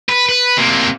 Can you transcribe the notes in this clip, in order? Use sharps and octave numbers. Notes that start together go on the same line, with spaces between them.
B4
B4
C3 A#3